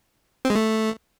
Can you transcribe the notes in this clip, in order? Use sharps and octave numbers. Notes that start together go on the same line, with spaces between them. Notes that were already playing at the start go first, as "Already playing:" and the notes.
C4
G#3
A3